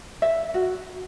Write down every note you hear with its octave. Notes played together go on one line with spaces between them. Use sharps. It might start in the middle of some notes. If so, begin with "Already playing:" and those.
E5
F#4